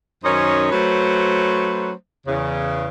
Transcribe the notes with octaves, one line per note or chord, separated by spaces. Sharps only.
F#2 D#3 C#4 D#4 C5 C#5
F#3 A3 C#4 B4 C5
E2 C#3